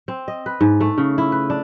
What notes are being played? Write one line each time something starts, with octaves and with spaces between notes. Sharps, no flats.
C4
D#5
B4
G#2
A3
C#3
E4
B4
D4